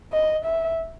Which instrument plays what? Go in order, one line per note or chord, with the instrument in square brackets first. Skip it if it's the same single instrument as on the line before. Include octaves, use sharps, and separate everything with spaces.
[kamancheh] D#5
E5